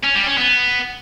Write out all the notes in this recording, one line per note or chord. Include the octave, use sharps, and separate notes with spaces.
C#4
G3
C#4
B3